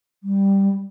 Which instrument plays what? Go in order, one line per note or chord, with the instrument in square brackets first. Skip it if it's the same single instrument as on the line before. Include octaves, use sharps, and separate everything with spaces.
[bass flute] G3